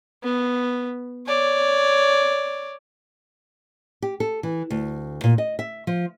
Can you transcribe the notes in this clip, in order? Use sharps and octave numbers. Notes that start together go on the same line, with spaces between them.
B3
C#5 D5
G4
A4
E3
D2
A#2
D#5
E5
F3